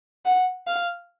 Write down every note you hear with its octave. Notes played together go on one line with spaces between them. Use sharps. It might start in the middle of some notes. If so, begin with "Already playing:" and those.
F#5
F5